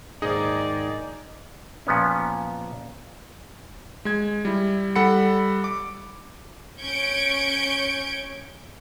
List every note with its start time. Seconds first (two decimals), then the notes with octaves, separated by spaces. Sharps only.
0.22 D#2 G#2 D#3 D#4 G#4 D5 D#5
1.87 A#2 F3 B3 C#4
4.05 G#3 G#6
4.45 G3 E4
4.95 G3 A4 F#5 B5 C#7
5.64 D6
6.81 C#4 G6 G#6 C#7 D7